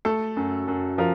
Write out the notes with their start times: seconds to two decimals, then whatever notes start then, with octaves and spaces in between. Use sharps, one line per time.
0.05 A3 A4
0.37 F#2
0.68 F#2
0.98 F3 A#4